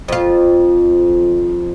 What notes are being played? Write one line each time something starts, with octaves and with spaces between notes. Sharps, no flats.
F2 F4